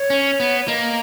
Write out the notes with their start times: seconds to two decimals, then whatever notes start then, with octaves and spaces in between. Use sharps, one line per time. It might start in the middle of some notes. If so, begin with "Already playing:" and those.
Already playing: C#5
0.10 C#4
0.40 B3
0.61 C#5
0.68 A#3 D#5